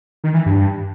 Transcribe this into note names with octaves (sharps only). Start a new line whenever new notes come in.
D#3
E3
G2
G2